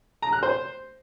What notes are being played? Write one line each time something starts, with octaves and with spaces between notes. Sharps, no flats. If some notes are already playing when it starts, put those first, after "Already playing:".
A#5
F#6
C5